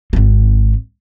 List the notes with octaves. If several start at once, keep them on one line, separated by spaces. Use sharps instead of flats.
G#1 C4